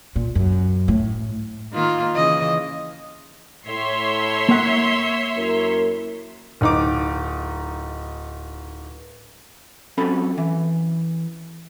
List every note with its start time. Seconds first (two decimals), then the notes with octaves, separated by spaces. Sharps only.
0.16 A#2
0.35 F#2
0.88 A2
1.72 D#3 A#3 F4
2.15 C#3 E3 D#5
3.67 A2 C#5 E5 C6
4.49 A#3 F#5
5.38 F#2 E4 A#4
6.61 D1 D#4 D6
9.97 F#3 C4 C#4 A4 B5
10.38 E3